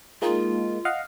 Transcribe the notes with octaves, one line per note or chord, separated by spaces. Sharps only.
G#3 A#3 D#4 F4
D#5 F5 F#5